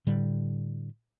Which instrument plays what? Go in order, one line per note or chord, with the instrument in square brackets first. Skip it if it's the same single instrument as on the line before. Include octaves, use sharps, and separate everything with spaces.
[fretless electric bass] A2 D3 G3